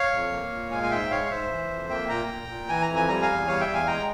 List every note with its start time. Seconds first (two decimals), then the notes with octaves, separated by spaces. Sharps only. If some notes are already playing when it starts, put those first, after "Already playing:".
Already playing: C#5 F5
0.13 F2
0.32 A#3
0.52 A#2
0.71 G#3 F5 G#5
0.83 G#5
0.91 G#2 E5 G5
1.11 G#3 C#5 F5
1.26 F5
1.30 G#2 C5 E5
1.50 E3
1.70 F2
1.89 A#3 E5 G5
2.09 A#2 G5 A#5
2.29 A#2
2.48 A#2
2.68 E3 G#5
2.82 A#5
2.88 F2
2.96 G#5
3.08 G3 A#5
3.22 F5 G#5
3.28 E2
3.47 G3 C#5 F5
3.61 E5 G5
3.67 E2
3.73 F5 G#5
3.87 G#3 G5 A#5